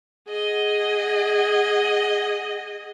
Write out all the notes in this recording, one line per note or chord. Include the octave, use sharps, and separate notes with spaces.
G#4 D#5 F#5